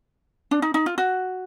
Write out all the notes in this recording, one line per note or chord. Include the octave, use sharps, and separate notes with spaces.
D4
D#4
D#4
F4
F#4